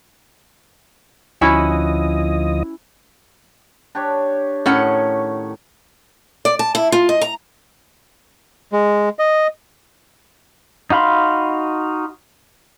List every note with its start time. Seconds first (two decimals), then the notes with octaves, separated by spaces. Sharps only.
1.41 D2 F3 C#4 E4 F#4 D#5
3.95 D4 G4 C#5
4.66 A2 D#3 C#4 C#5 F#5
6.45 D5
6.59 A5
6.75 E4
6.92 F4
7.09 D#5
7.21 A#5
8.73 G#3
9.19 D#5
10.90 D#4 F#4 F5 B5 C6